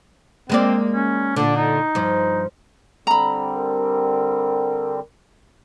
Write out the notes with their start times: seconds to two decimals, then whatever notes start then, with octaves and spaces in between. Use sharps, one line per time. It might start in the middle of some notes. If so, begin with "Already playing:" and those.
0.50 G#3 A#3 C4 D5
0.93 C#4
1.36 A#2 D3 D4
1.56 D#4
1.95 G2 F3
3.07 D3 G3 C4 A#5 B5
3.55 A#4